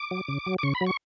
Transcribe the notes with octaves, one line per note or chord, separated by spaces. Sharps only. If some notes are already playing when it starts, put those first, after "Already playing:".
Already playing: D6
F#3
C#3
F#3
D6
C#3 C#6
B5
F#3
C#6